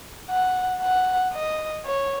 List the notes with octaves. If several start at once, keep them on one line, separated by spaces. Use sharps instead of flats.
F#5
F#5
D#5
C#5